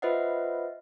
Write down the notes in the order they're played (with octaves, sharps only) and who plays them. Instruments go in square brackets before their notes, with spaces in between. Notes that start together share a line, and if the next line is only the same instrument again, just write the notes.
[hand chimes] F4 B4 C5 D#5 E5 F#5